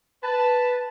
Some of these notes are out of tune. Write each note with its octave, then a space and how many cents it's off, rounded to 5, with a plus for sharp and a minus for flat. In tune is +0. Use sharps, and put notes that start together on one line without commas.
B4 +0 A5 +0